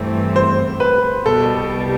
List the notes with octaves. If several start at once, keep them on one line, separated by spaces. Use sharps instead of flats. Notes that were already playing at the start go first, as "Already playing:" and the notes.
Already playing: G2 E3 A3 C4
C5
B4
C2 B2 G3 A4